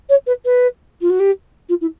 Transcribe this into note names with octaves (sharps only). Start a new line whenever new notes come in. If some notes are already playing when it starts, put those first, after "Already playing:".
C#5
B4
B4
F4
F#4
G4
F4
E4